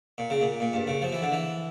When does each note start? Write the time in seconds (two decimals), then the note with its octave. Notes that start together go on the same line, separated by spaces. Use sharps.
0.18 A#2
0.30 C#3
0.41 A#2
0.60 A#2
0.73 G2
0.87 C#3
1.02 F3
1.12 E3
1.22 D3
1.32 E3